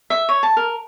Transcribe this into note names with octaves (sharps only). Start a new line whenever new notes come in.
E5
C#5
A5
A#4